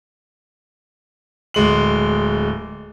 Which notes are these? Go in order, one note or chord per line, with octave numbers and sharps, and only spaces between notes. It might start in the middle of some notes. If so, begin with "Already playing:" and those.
D1 G#3 F#7